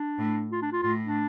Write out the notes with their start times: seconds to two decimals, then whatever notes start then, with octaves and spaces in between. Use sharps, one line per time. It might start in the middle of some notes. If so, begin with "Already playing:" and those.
Already playing: D4
0.19 A2
0.52 F4
0.62 D4
0.72 F4
0.83 A2 F4
1.04 D4